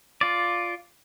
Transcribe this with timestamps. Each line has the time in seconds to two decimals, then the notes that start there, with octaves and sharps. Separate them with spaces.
0.21 F4 D5